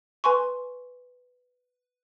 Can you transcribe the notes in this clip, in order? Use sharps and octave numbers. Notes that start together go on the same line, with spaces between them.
B4 G#5 C6 C#6